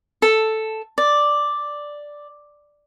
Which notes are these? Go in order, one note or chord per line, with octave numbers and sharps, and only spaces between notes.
A4
D5